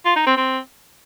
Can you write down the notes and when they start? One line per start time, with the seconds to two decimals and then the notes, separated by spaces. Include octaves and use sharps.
0.05 F4
0.16 D#4
0.26 C4
0.37 C4